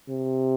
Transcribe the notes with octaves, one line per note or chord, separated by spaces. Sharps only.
C3